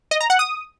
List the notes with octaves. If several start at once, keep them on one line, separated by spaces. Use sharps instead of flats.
D#5
A#5
F#5
D#6